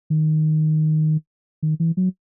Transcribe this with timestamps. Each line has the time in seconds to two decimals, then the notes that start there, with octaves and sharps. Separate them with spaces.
0.10 D#3
1.63 D#3
1.80 E3
1.97 F#3